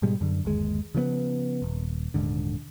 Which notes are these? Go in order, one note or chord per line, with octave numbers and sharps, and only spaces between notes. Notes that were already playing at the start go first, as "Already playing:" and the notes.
G#2 B2 G3 G#3
F#2 D3
G1 D#2 G#3
C#3 F3 A3 B3
D#1
D#1 G#2 D3